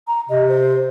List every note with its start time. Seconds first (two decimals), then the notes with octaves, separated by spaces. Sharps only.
0.07 A#5
0.29 C3 D#5
0.49 C5